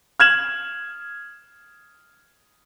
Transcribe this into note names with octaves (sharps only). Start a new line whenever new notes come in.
F6 G#6 E7 F#7